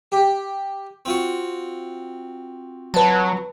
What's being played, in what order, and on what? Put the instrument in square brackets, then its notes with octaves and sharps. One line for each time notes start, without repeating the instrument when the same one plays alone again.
[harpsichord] G4
C4 F4 F#4
[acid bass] F#3 [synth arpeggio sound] B4 A5